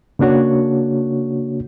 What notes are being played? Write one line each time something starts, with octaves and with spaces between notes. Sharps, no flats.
C#3 A#3 D4 F#4 C#5